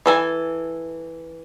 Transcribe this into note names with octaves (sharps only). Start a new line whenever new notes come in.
E3 A4 G#5